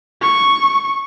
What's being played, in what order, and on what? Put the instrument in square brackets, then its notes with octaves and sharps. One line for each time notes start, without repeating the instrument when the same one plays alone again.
[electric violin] C#6